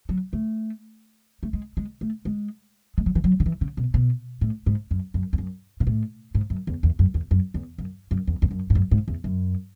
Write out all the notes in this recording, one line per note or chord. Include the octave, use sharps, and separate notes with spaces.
F#3
A3
A3
G#3
G#3
A3
G#3
G#3
F#3
E3
F#3
D3
E3
C#3
B2
B2
A2
G#2
F#2
F#2
E2
F#2
B2
A2
G#2
F#2
E2
E2
F#2
E2
F#2
E2
F#2
F#2
E2
E2
F#2
G#2
F#2
G#2
E2
F#2